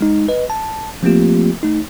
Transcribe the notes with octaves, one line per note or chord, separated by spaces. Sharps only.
G#3 D#4
B4 D#5
A5
F3 A3 A#3 C4 F4 G4
A3 D#4